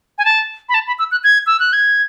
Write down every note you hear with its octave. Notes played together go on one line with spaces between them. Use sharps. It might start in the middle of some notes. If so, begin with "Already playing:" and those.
G#5
A5
B5
A5
B5
E6
F#6
G#6
E6
F#6
G#6